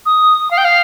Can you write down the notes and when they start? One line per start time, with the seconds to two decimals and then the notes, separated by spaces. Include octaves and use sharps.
0.06 D#6
0.51 F5
0.58 G5
0.65 F5